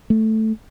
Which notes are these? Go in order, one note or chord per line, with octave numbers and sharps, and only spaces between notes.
A3